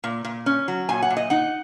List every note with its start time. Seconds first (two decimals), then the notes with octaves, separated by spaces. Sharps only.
0.04 A#2
0.25 A#2
0.46 C#4
0.68 F#3
0.89 A#2 G#5
1.02 F#5
1.10 A#2
1.17 D#5
1.30 D#4 F#5